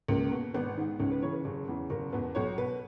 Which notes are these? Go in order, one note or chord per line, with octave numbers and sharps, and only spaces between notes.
C#2 A#3
B2
G#1 B3
G#2 D#3
C#2 C#4
B4
C#3 E3 C#5
B4
F#1 G#4
E2 C#3 E3
F#1 A#4
E2 B2 B4
B1 C#5
B2 B4